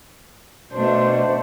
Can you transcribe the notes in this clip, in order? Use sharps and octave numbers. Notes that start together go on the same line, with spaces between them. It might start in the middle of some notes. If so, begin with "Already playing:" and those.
B2 A3 D4 C5